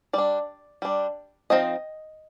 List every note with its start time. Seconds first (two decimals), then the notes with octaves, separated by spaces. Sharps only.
0.13 G3 D4 D5
0.82 G3 D4
1.50 F3 C4 D#4 D#5